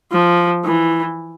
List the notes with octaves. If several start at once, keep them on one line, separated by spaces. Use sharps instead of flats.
F3
E3